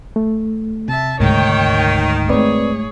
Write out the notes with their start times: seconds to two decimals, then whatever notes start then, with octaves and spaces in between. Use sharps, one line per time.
0.16 A3
0.88 C3 E5 A5
1.20 D2 G#2 D#3 C#5 G5
2.29 G#2 A3 C4 G#4 B4 C#5 D5